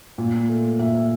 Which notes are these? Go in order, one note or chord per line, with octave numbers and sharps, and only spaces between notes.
A#2 F4
A3
A#2 E5
E5